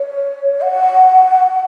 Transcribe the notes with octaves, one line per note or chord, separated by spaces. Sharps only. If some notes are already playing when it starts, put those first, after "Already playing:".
Already playing: C#5
F#5